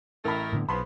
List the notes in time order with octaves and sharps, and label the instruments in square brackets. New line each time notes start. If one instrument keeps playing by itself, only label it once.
[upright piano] A1 B5 [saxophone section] A3 A#4
[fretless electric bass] A2 D3 B3
[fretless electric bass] B1 [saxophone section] E2 F3 B3 [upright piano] B5 C6